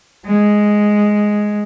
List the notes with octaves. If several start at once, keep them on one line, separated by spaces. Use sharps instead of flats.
G#3